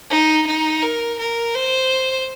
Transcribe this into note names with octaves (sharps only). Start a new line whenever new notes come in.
D#4
D#4
A#4
A#4
C5